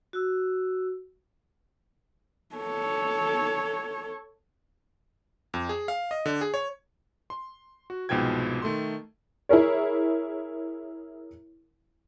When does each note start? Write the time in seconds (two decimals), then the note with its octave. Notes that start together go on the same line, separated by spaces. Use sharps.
0.13 F#4 E6
2.55 A4 C#5
5.54 F2
5.69 G#4
5.88 F5
6.11 D#5
6.26 D3
6.41 G#4
6.54 C#5
7.30 C6
7.90 F#4
8.09 C2 G#2 B2 F3 G5 G#6
8.62 D#3 A3 A4 C6
9.49 E4 G#4 A#4 C#5